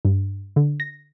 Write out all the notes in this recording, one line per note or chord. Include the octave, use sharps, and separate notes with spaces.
G2
D3
A#6